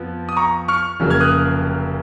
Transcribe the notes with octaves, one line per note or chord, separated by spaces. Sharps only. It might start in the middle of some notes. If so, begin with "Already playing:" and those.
Already playing: F2 F3 B3
D#6
A#5 C#6
C#6 F6
F1 F2 C#3 F#3 A#3
F6 G#6
D#6 F#6